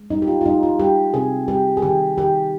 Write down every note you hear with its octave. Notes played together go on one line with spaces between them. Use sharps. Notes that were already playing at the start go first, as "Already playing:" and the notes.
Already playing: G#3
G3 D#4
G4
F4
F4
G3 D#4
F4
G3 G4
C3 G#4
G3 G4
G#4
D#3 G4
D#3 G4